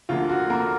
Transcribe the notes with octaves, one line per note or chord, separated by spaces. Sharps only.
D2 D3 F3 A#3 F4
F#4
A#3 A#4